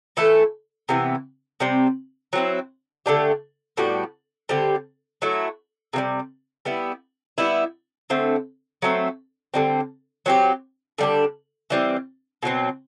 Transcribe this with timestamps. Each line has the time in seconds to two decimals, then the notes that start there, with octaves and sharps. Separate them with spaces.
0.17 E3 A3 E4 A4
0.89 C3 E3 B3
1.60 C3 G3 C4
2.33 F#3 C4 E4
3.06 D3 A3 D4 G4
3.77 A2 G3 B3 F#4
4.49 D3 G3 C4 G4
5.22 F#3 A3 E4
5.93 C3 E3 G3
6.65 G3 B3 E4
7.38 G3 B3 E4
8.10 D3 A3 C4
8.82 F#3 A3 C4
9.54 D3 G3 C4
10.26 F#3 C4 G4
10.98 D3 G3 D4
11.70 E3 G3 C4
12.43 B2 F#3 C4